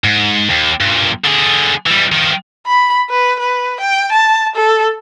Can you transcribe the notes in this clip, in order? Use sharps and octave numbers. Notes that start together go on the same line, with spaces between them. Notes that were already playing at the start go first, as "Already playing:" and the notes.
G#2
D#2
G2 A#2
D3 G#4
E3 G3
D#3 F3
B5
B4
B4
G5
A5
A4